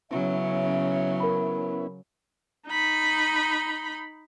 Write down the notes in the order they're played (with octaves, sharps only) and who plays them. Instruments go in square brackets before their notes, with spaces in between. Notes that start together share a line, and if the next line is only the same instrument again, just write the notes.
[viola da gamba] C#3 F#3 [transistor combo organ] B3 C#4 E4 [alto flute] E5
[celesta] A#4 B5
[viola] D#4 B5